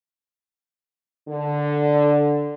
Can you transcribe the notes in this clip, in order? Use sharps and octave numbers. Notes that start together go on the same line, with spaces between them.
D3